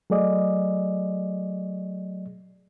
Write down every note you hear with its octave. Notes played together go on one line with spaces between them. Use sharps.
F#3 A3 G#4 D5 D#5